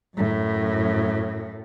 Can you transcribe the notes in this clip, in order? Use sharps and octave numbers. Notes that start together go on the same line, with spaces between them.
F#2 A2